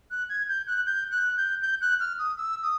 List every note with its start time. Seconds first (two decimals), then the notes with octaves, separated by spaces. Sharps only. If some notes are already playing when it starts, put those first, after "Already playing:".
0.11 F#6
0.29 G#6
0.48 G6
0.67 F#6
0.86 G6
1.11 F#6
1.37 G6
1.62 G6
1.81 F#6
2.00 F6
2.19 D#6
2.38 E6
2.63 D#6